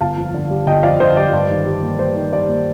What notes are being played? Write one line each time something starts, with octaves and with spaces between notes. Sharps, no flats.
G1 F5 A5
F2
D3
G3
G1 D#5 G5
F2 D5 F5
D3 C5 D#5
G3 D5
G2
D#3
G3
A#3
G2 C5
D#3
G3 D5
A#3